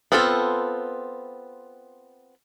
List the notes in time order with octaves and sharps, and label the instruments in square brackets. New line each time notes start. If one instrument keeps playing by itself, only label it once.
[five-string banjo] B3 C4 F4 A4 A5